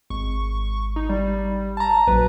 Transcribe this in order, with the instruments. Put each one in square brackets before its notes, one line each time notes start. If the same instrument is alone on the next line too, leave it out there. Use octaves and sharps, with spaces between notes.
[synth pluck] G#1 [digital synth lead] C#6
[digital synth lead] D#4
G3
[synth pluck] A5 A#5
[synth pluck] A#1 F#3 [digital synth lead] B4